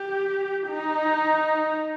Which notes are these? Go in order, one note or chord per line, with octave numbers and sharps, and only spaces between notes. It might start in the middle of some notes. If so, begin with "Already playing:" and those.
Already playing: G4
D#4